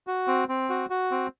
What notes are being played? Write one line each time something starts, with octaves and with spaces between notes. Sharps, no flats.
F#4
C4
C4
F#4
F#4
C4